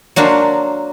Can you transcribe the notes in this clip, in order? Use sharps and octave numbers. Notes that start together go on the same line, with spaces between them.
F#3 A#3 D4 F#4 C5